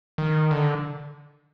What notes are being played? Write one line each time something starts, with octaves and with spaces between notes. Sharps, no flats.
D#3
D3